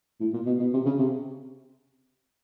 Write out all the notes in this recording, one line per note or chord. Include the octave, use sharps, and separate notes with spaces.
A2
A#2
B2
B2
C3
C#3
C3